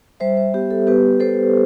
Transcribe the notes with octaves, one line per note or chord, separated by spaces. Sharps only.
G3 C5 E5
C5 E5
B3 G4
A4
B3 G4 B4
B3 A4 C5